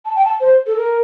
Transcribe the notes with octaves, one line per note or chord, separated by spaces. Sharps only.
A5
G5
A5
C5
A4
A#4